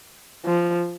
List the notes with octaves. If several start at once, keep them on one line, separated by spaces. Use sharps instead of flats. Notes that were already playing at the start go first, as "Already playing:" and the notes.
F3